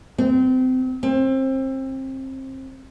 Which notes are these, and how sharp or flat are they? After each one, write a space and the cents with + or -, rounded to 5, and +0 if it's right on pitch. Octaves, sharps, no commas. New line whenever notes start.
C4 -30
C4 +25